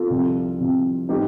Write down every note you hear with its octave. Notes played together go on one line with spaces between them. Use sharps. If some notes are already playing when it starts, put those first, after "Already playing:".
Already playing: F4 A4
C2 C3 F3
C2 C3 F3
A2 G3 D#4 G4